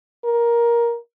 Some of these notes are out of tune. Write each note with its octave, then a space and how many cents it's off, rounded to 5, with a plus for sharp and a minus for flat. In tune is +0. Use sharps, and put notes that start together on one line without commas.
A#4 +15